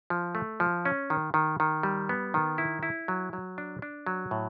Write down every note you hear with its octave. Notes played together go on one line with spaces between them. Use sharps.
F3
A3
F3
C#4
D#3
D#3
D#3
G3
B3
D#3
E4
E4
F#3
F#3
D4
D4
F#3
A2